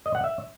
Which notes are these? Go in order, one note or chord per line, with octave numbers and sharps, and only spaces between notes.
D#5
F#5
E5